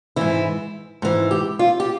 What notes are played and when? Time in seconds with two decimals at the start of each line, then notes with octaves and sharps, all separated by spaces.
0.16 G#2 E3 E4
1.02 G#2 E3
1.31 G4
1.59 F4
1.80 G4